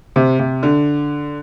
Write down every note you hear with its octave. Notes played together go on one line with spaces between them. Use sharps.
C3
C3
D3